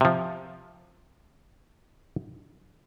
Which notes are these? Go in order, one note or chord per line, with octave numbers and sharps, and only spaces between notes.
C3 F3